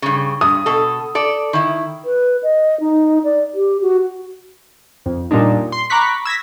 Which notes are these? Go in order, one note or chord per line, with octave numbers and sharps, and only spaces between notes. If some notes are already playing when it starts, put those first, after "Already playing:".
G2 C#3
G2 D#6
B2 A4
A4 D5
D#3 E4
B4
D#5
D#4
D5
G4
F#4
F2
A#2 G3 D4 D#4
C6
A#5 B5 C#6 D6 F#6 B6
E6 G#6 A#6 B6